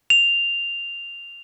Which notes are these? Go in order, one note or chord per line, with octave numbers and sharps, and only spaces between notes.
F7